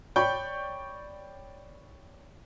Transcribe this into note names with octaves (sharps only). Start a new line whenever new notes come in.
C#5 D5 G5 B5 C#6 G6